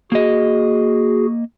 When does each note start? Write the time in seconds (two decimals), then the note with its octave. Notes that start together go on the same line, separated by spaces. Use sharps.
0.12 A#3 F#4 G#4 D#5